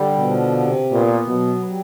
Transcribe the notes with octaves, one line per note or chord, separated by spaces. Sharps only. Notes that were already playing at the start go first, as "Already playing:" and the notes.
Already playing: D3 G3
B2 F3
C3
A#2 B3
B2 F#3
G3